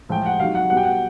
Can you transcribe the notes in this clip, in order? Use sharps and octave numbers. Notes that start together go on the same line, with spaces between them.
A2 F3 G#3 G5
F#5
C3 D#3 F#3 F5
F#5
B2 G3 F#5
G5
F#5